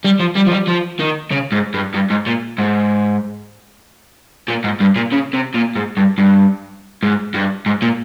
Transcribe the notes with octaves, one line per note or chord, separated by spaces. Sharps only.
G3
F3
G3
F3
G3
F3
D#3
C#3
G#2
G2
G2
G#2
A#2
G#2
A#2
G#2
G2
A#2
C#3
C3
A#2
G#2
G2
G2
G#2
G2
G#2
A#2